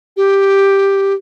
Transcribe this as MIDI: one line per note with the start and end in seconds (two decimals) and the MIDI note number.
0.17 1.14 67